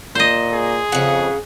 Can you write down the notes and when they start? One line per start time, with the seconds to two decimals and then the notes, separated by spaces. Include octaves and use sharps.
0.15 A#2 C5 D#5
0.53 G#4
0.92 F2 C#3 F#5